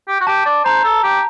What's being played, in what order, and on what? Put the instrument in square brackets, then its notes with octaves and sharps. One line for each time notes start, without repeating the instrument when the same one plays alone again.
[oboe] G4
F#4
[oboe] G4 [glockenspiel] A5
[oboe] D5
[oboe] C5 [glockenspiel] A#5
[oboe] A4
G4